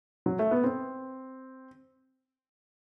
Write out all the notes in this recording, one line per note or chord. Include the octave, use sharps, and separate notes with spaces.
F#3
A3
B3
C4